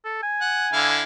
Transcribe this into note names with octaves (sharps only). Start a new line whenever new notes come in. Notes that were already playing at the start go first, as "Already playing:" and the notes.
A4
G#5
F#5
D3 E4 F5